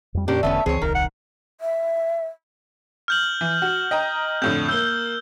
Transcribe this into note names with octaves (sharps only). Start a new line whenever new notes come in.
F2 G3
F2 A#2 A#3 C#4 D4 G4
E1 D3 A3 B3 C#4 E5
C#2 E3 C4 G#4 C#5
D#1 C2 D#3 A#4
F#5
E5
F6 G6 F#7
E3
F#4
D#5 G5 A#5
F2 A2 D3 G6
A#3 E6 G6 G7